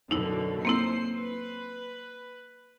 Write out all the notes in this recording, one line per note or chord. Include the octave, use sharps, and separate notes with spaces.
F#2 B2 D3 D#4 E4
A#3 C4 E4 C5 C7
B4